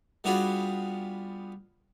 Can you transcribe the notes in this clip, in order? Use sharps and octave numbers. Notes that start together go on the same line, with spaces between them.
G3 B3 D4 F4 F#4 G#4